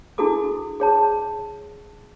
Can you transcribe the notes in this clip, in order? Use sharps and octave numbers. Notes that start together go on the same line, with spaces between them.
D4 E4 F#4 G#4 A4 D6
G#4 C#5 A5